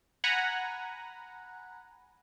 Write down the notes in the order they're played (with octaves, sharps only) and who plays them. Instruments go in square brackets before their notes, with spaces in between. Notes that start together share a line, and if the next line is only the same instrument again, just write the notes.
[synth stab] F#5 G#5 A#5 B5